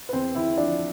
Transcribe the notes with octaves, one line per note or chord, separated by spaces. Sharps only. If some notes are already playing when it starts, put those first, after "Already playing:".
B4
E2 C4 C5
E2 E4 E5
F3 D4 D5